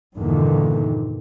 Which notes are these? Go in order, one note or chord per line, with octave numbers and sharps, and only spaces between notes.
E2 G2 A#2 D3 D#3